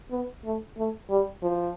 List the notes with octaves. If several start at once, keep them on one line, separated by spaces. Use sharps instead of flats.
B3
A3
A3
G3
F3